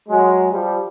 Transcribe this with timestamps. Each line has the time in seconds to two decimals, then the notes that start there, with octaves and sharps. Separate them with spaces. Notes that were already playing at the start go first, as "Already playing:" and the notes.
0.08 F#3 G#3
0.51 F3 G3